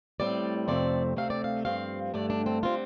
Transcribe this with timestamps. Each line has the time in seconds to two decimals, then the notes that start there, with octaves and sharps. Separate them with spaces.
0.20 A2 G3 C4 D5
0.68 F2 C3 A3 C4 D5
1.16 D2 C3 A3 C4 F5
1.30 D5
1.44 F5
1.65 G2 F3 C4 F5
2.14 G2 D3 A3 D5
2.30 D4
2.46 C4
2.63 D3 G3 C4 F4